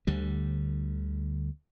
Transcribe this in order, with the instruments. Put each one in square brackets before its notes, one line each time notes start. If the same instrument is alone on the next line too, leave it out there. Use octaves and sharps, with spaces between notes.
[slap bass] D2 D3 G3